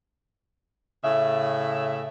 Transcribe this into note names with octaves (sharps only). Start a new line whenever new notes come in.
A2 C#3 E5